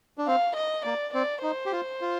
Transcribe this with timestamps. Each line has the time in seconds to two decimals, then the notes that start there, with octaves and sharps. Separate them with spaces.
0.18 D4
0.27 C4 F5
0.56 D#5
0.85 A#3 D5
1.14 C4 D5
1.43 D#4 C5
1.66 G4
1.72 F4
2.01 F4